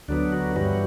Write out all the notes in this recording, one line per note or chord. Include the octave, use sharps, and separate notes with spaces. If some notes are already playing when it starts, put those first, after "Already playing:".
D2 D3 F#3 B3 D4
F#4
G2 E3 G3 F#4